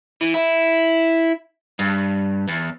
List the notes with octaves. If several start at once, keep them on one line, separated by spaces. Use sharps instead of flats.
E3
E4
G2
E2